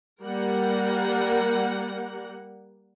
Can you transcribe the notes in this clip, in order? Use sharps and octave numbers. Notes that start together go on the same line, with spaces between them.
G3 A#3 A#4 F#5